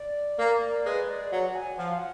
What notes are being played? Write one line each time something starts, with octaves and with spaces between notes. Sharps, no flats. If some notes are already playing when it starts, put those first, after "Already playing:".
Already playing: D5
A#3
G#3 B4
D5
F#3 F#5
G#5
F3 F#5
F5
F#5